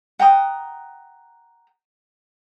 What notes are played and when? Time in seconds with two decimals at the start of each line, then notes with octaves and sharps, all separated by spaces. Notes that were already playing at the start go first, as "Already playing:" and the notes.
0.19 F#5 G5 A#5 D#6